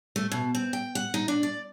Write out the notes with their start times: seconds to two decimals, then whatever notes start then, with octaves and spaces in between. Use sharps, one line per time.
0.16 A3
0.32 B2
0.55 C4
0.73 G5
0.95 F#5
1.14 D#4
1.28 D4
1.43 D5